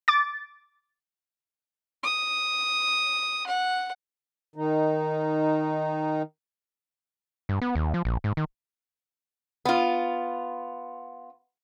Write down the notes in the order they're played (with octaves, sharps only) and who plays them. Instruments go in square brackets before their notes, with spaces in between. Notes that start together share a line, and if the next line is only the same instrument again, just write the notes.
[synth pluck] D6 A6
[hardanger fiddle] D#6
F#5
[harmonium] D#3 D#4
[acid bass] G2
B3
D#2
F3
A#1
G#2
D#3
[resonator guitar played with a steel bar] B3 F4